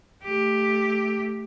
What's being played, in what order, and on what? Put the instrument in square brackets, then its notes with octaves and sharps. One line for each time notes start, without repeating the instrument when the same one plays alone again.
[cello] A3 G4